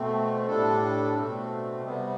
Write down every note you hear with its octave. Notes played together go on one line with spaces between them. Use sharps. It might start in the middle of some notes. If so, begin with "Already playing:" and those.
Already playing: B2 A3 C4
A2 G3 D4 A4
B2 A3 C4
C3 G3 B3